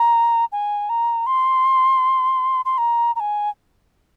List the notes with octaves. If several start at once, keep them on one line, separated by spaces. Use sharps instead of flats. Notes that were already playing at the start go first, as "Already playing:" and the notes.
Already playing: A#5
G#5
A#5
C6
C6
A#5
A#5
G#5